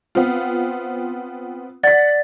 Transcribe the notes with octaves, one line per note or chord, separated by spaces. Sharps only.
B3 C4 F4
D5 F#5 A6 B6